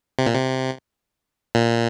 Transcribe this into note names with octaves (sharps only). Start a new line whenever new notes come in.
C3
A#2
C3
A#2